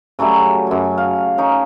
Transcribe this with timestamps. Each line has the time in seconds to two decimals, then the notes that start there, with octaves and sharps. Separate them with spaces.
0.19 C#3 F#3 G3 A3
0.67 F#2 G#5
0.98 F5
1.38 C#4 D#4 C#5